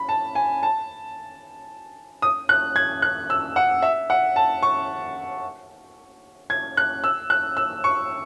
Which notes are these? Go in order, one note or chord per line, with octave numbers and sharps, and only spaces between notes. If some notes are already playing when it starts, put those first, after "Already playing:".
Already playing: B5
A5
G#5
A5
D#6
F#6
G#6
F#6
E6
F#5
E5
F#5
A5
C#6
G#6
F#6
E6
F#6
E6
C#6